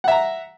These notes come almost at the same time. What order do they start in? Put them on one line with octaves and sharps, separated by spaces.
F#5 E5 A#5